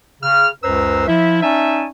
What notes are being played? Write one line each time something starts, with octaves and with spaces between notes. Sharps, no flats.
C#3 F6
C#2 F#2 B4 C5 A#5 E6
F3 E4 E5
C#4 D#4 D5 E5 G#5 A5